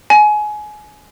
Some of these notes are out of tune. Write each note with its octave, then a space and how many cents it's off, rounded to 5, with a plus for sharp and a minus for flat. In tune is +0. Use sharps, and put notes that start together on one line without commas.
G#5 +25